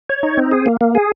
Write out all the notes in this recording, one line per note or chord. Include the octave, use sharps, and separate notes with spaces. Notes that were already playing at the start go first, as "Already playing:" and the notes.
C#5
D#4
C4
G#4
A#3
A#3
G#4